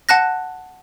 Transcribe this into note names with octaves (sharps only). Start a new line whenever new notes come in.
F#5 A5 F#6 A#6